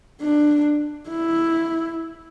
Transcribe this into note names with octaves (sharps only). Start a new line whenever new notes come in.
D4
E4